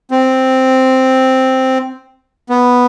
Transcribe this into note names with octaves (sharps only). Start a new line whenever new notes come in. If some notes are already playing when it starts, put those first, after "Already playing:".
C4
B3